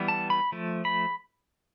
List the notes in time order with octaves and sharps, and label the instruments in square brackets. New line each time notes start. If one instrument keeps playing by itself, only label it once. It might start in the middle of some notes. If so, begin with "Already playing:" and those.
Already playing: [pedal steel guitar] E3 G3 B3
A5
B5
F3 A3
B5